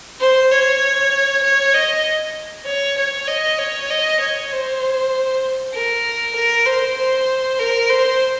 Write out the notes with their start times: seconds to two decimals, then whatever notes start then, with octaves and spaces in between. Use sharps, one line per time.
0.20 C5
0.51 C#5
1.43 C#5
1.74 D#5
2.66 C#5
2.97 C#5
3.27 D#5
3.58 C#5
3.90 D#5
4.20 C#5
4.51 C5
5.74 A#4
6.35 A#4
6.66 C5
6.97 C5
7.59 A#4
7.89 C5